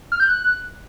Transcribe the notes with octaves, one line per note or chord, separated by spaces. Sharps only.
F6
G6
F#6